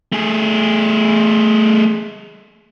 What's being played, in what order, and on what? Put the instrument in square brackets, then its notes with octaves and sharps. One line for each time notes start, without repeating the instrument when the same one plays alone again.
[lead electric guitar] A3 G#4